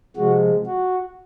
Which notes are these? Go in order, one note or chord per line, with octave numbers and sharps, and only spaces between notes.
C3 F3 G#3 F#4
F#4